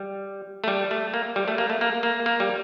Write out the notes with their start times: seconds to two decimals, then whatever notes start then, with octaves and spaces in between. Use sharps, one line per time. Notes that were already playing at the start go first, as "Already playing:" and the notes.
Already playing: G3
0.64 A3
0.68 G3
0.91 A3
1.14 A#3
1.36 G3
1.48 A3
1.58 A#3
1.70 A3
1.81 A#3
2.03 A#3
2.26 A#3
2.40 G3